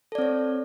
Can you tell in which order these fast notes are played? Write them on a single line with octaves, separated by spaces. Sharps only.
A4 D5 C4 C#5